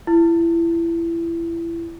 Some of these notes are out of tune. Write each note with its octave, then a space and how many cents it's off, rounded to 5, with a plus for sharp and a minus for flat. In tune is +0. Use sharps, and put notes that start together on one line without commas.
E4 +25